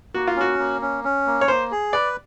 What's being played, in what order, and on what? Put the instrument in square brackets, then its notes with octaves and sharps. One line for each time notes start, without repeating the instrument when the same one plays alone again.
[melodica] A#3 [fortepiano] F#4
[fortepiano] F4
[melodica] C#4 [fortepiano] F#4
[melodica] A#3
C#4
C#4
A#3
[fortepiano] C#5
[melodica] A#3 [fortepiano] C5
[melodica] G#4
[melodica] B4 [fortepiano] D5